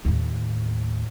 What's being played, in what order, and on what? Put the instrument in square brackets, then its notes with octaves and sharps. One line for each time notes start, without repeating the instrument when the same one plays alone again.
[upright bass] D#2 A2